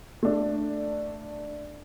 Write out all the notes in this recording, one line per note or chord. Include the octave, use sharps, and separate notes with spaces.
A3 D4